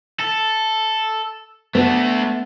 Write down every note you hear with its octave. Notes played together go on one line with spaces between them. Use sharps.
A4
A3 B3 D4